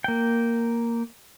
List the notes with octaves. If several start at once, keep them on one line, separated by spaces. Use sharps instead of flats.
A#3 G5